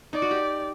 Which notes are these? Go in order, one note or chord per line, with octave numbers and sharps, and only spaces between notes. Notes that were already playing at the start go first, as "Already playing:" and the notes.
D#4 D5
F#4
G4